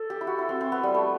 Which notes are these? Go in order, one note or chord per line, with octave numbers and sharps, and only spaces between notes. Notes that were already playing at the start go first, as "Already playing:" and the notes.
Already playing: A4
G4
E4
F#4
E4
C4
C4
B3
G3
A3